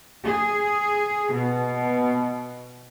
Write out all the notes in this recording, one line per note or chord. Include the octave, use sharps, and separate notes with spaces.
G#4
B2